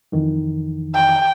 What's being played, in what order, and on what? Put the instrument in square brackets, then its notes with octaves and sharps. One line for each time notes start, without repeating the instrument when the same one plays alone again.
[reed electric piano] F2 D#3 E3
[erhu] G5